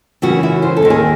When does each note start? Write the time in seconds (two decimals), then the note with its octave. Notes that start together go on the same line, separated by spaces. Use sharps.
0.22 F#2 C#3 E3 F#4
0.43 E4
0.62 C5
0.77 A4
0.82 D#2 D#3
0.90 G#4